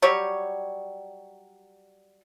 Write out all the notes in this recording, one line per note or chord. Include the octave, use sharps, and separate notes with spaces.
F#3 G3 G4 C#5